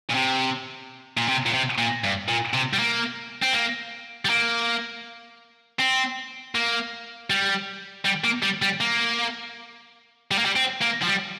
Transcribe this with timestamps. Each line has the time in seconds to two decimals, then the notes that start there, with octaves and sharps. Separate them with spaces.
0.10 A#2
0.15 C3
1.17 A#2
1.28 C3
1.46 A#2
1.54 C3
1.78 A#2
2.04 G2
2.29 A#2
2.54 C3
2.73 G3
2.79 A#3
3.43 C4
3.54 A#3
4.25 G3
4.29 A#3
5.79 C4
6.55 A#3
7.30 G3
8.05 G3
8.24 A#3
8.43 G3
8.62 G3
8.81 A#3
10.31 G3
10.38 A#3
10.46 G3
10.56 C4
10.81 A#3
11.02 F3
11.06 G3